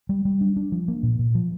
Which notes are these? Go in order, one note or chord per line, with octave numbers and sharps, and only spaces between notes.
G3
G3
D4
D4
F3
A#3
A#2
A#2
F3